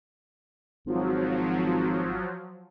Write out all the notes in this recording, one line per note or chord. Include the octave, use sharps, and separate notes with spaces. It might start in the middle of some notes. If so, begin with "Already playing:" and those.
G#1 F3 F#3